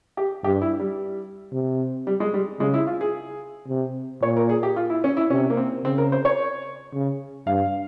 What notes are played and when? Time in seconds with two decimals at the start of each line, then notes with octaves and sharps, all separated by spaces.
0.17 G4
0.44 G2 G4
0.62 E4
0.80 G3
1.52 C3
2.07 G3
2.20 G#3
2.34 G3
2.60 C#3 G#3
2.74 E4
2.87 F4
3.01 G#4
3.68 C3
4.23 A#2 C#5
4.37 A#4
4.49 G#4
4.63 G4
4.76 F4
4.90 E4
5.04 C#4
5.17 E4
5.30 C3 C#4
5.50 A#3
5.57 C4
5.84 C#3 C4
5.98 A#4
6.12 C5
6.25 C#5
6.93 C#3
7.47 G2 F5